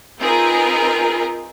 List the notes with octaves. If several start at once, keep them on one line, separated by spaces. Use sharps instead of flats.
C4 D#4 F4 G#4 A#4 B4